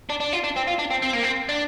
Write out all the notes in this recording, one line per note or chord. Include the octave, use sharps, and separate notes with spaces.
D4
D4
F4
D4
C4
F4
D4
C4
C4
A#3
C4
D4